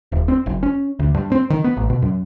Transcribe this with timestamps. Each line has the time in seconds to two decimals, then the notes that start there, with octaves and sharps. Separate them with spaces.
0.12 D#1
0.28 C4
0.46 F#1
0.63 C#4
0.99 D2
1.15 G2
1.32 C4
1.50 D#3
1.64 B3
1.77 A1
1.90 B2
2.02 F#2